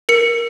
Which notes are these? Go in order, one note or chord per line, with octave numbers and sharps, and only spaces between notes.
A#4 C#7